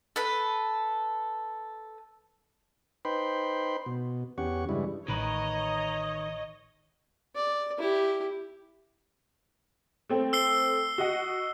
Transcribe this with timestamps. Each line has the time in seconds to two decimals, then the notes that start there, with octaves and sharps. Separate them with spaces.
0.16 A4 B4
3.05 D#4 B4 C5 G5 B5 C6
3.86 B2
4.38 E2 C#4 G4 F#5 C#6
4.69 G2 C#3 E3 G3 G#3 E4
5.08 A1 D#3 B4 C#5 D#5 A#5
7.35 D5
7.79 E4 G4
10.09 A3 C4
10.33 E6 C7 G7
10.98 F#4 D#5 F#5